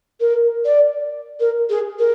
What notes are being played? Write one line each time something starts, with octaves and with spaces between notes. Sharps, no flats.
A#4
D5
A#4
G#4
A#4